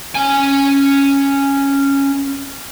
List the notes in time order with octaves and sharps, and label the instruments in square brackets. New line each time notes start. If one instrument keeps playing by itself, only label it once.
[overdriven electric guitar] C#4 G#5